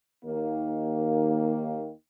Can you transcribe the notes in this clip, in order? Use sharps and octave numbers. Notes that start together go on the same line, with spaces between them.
D#2 D#3 A#3